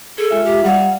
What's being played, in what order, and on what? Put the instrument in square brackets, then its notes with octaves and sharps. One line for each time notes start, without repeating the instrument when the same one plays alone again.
[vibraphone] G#4 [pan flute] A4
[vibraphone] G#3 F4 E5
[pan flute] G4
[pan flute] G3 [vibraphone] F5 F#5